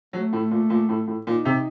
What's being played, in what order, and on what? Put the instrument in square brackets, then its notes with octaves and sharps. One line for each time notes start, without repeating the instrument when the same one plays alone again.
[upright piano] F#3 [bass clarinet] A3
[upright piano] A2
A#2
A#2
A2
A2
[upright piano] A#2 [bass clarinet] D#4
[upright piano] C3